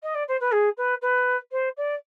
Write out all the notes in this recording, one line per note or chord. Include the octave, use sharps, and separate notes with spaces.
D#5
D5
C5
B4
G#4
B4
B4
C5
D5